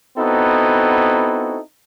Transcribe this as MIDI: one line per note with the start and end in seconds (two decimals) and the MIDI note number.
0.18 1.58 59
0.18 1.58 60
0.18 1.58 63
0.18 1.58 64
0.18 1.58 66
0.18 1.58 69